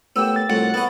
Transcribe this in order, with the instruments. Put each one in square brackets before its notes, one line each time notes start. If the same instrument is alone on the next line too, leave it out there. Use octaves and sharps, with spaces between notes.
[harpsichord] A2 B3 [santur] G4 A#4 [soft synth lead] E6
[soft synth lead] A6
[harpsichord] C2 F2 A2 [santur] F#4 D6 [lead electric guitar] F#5
[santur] B3 C#5 [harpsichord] E4 D#5